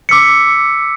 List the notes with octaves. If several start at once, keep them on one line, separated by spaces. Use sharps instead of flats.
D6 E6 B6 C#7